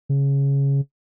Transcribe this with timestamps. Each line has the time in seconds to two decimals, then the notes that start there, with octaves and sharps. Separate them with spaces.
0.09 C#3